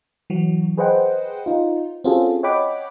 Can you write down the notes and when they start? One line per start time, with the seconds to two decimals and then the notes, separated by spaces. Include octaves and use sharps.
0.30 E3 F#3 F#4
0.77 G#4 B4 C5 D#5 F#5 G5
1.46 D#4 F4
2.04 C4 C#4 F4 F#4 G#4 A4
2.43 C#5 D#5 F#5 G5 B5 D6